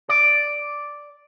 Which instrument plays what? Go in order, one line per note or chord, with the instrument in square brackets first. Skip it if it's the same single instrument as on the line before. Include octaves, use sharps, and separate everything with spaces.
[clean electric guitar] D5